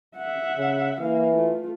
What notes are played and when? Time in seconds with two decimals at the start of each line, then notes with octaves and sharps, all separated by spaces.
0.17 E5 F#5
0.57 C#3
1.01 E3 A#3 F5
1.33 A3 F4